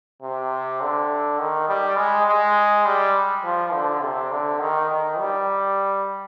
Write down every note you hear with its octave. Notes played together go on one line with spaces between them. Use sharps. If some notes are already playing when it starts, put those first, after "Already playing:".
C3
D3
D#3
G3
G#3
G#3
G3
F3
D3
C3
D3
D#3
D#3
G3